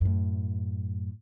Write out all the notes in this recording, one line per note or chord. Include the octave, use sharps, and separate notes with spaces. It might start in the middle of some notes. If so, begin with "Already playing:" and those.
F#2 A2